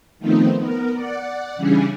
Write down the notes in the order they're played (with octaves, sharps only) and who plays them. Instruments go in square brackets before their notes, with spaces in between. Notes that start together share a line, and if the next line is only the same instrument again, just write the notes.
[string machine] D#3 F3 A3 B3 C4 D#4
B3 A#4
D5 F#5
C#3 E3 G3 C#4 D4 G#4